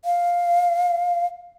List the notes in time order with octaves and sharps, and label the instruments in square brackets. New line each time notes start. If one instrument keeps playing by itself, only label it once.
[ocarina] F5